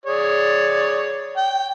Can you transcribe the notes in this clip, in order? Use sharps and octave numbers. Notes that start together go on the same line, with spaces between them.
G#4 C#5 D5
G5